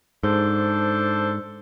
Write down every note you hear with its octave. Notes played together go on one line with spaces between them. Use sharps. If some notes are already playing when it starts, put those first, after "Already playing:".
G#2 D4 A4 C5